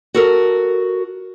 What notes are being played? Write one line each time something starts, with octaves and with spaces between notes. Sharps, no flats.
F#4 A4 A#4